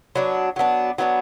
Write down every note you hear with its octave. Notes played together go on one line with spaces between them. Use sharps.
F#3 B3 D4
F#3 B3 D4
F#3 B3 D4